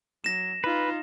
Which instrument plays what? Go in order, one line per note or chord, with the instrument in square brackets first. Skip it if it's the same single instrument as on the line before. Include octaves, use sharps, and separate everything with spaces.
[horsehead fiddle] F#3 [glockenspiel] A#6 E7
[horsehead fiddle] D#4 F4 [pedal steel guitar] B4